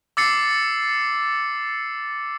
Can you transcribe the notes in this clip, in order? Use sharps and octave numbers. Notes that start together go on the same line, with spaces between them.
D6 E6 A6 C7 C#7